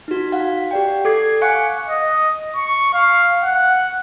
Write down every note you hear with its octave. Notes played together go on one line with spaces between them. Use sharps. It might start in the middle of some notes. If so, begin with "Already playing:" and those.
D#4 F#4
F#4 F5 F#5
G4 D5 G5
A4 D6 G#6 C7
F5 F#5 G#5 C#6 F#6 C#7
D#5
C#6
F5
F#5